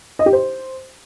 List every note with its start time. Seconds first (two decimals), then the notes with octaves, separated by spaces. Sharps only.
0.19 D#5
0.26 G4
0.33 C5